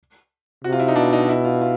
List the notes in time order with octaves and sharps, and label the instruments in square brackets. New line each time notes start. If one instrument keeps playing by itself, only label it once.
[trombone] C3 [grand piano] F#4
[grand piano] F4
E4
D#4
[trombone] B2 [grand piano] D4
[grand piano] D#4
E4
F4
F4